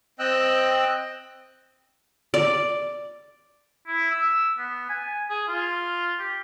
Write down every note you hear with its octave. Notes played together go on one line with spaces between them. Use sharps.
C4 D#5 G5 E6 F#6
D5
E4
E6
B3
G#5
G#4
F4
G4